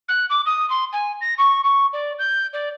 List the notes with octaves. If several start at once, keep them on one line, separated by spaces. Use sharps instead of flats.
F#6
D6
D#6
C6
G#5
A#6
C#6
C#6
D5
G6
D5